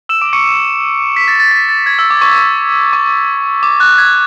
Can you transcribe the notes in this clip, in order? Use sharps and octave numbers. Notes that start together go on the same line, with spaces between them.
E6 E7
D6 D7
C#6 C#7
B6
A6
A6
B6
A6
G#6
E6
D6
C#6
C#6
D6
F#6
G#6